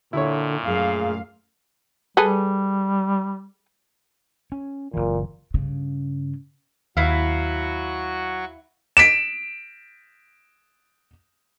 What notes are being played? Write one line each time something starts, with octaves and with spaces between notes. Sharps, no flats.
A#2 D3 E4 C#5
F#2 A3 G#4 F5
G3 G#4 A4 B4
C#4
F#1 A#2 E3
G2 C#3
D#2 F#3 E4 F#4 F5 C#6
B6 D7 E7